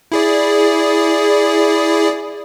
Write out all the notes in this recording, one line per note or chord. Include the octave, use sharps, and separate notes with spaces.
E4 G#4 D5